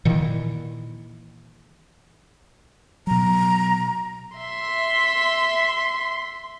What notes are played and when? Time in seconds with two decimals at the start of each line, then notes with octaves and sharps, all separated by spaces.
0.05 A#2 D#3 E3
3.07 B2 F#3 A#5
4.36 E5 C6 B6